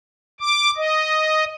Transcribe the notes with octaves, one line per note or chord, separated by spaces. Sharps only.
D6
D#5